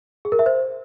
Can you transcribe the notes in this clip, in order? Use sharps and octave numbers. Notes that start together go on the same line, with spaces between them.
G#4
A#4
E5
C5